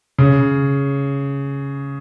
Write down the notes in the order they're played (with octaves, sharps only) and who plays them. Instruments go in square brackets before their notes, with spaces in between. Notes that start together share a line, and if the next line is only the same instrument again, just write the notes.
[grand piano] C#3